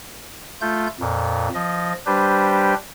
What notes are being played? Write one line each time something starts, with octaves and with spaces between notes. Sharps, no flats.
A3 F4 G6
F2 A#2
F3 D#5
G3 D4 G4 B4 C5